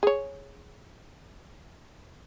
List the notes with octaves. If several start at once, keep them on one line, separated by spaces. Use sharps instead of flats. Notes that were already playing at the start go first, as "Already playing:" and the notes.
G#4 C#5